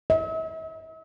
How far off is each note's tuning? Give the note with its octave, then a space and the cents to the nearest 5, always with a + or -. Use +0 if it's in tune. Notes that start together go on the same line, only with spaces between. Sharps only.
E5 -45